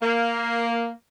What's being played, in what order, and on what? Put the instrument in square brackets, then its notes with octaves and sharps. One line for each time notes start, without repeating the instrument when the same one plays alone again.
[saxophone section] A#3